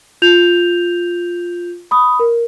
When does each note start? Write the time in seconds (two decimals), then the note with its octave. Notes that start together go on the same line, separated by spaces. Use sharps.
0.22 F4 G6 F7
1.91 B5 D#6
2.20 A#4